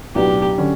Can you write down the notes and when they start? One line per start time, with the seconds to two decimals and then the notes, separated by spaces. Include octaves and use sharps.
0.15 B1 A2 F#3 B3 D4 G4
0.58 D3 F#3 C#4